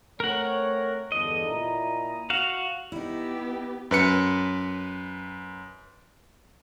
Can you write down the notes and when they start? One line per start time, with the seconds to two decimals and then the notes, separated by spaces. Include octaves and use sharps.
0.20 A3 C4 A#4 C#5 F#5
1.12 E2 G2 D3 D#5
1.48 A#2 E4 A#5
2.30 F#4 F5
2.92 B3 D#4 E4 G4
3.91 F#2 B4 C#7